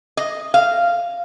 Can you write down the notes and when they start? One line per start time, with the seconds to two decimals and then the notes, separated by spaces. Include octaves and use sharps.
0.17 D#5
0.54 F5